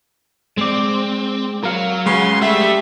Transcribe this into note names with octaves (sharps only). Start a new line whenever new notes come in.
G#3 C4 D5
F#3 A#4 F5
C#3 G#3 F#4 B4 C6
G3 A3 E5